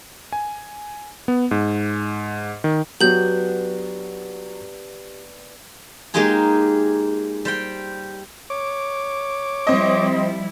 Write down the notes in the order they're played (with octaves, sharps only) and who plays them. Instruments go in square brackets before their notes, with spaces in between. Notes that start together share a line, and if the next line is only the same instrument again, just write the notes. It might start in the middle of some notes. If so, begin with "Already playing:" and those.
[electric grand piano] G#5
B3
G#2
D#3
[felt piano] F#3 [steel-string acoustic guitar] B3 D4 [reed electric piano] G4 [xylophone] G6 F#7
[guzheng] G#3 A#3 D#4 F4 G4 G#4
G3 C5 G5
[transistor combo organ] C#5 D6
[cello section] F3 G3 E4 [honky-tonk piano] C4 D#5